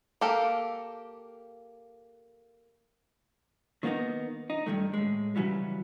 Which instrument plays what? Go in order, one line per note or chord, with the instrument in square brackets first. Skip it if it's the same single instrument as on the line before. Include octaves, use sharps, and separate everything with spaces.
[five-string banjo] A#3 G4 A4 F5
[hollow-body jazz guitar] D#3 A#3 B3 D4 D#4
D#4
G2 D#3 A3
A2 G#3
C#3 E3 F#3 G3